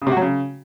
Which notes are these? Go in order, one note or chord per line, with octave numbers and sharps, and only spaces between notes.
C#3
C3
F#4
F#3
C#3